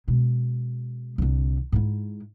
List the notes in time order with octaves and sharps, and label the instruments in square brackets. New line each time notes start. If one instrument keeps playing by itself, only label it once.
[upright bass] B2 G#3
C2 D3
G#2 E4